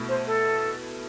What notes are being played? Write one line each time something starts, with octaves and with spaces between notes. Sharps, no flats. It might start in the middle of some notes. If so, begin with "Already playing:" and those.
Already playing: B2 A3 E4
C5
A4